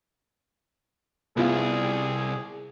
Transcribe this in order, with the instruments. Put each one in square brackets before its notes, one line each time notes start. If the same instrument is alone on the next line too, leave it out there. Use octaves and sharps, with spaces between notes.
[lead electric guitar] C2 [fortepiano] B3 E4 F4 [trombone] G#4